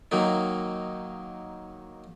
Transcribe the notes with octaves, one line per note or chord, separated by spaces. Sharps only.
D#3 F#3 A#3 D#4